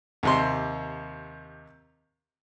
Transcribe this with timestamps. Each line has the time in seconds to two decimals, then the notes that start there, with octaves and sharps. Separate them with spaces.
0.23 D#2 C3 C6